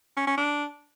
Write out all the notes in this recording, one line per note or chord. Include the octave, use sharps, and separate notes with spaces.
C#4
C#4
D4